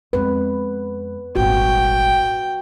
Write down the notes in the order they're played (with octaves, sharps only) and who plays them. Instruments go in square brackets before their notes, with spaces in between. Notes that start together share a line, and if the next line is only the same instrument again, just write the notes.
[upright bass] F2 G#3 [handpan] B4
[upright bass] D#1 G#1 [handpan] F#4 [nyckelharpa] G5